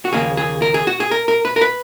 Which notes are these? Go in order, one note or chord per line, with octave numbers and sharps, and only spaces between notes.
F#4
D#2 C#3 F3 A#3 G#4
G#4
A#4
G#4
F#4
G#4
A#4
A#4
B4
A#4
B4